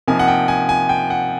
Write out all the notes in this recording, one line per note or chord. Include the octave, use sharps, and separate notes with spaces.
C3 F3 A#3 D#4 G#5
F#5
G5
G#5
G#5
G5
F#5